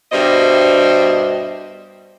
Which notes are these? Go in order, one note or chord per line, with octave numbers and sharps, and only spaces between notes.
G2 B2 G3 C5 D#5 E5